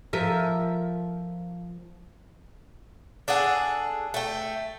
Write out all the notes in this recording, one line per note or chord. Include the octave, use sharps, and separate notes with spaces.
F3 A#4 E5
D4 G#4 A4 F#5
A3 G5